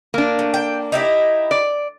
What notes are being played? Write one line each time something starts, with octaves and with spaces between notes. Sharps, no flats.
A#3 D4
A3
G5
D#4 E4 G4
D5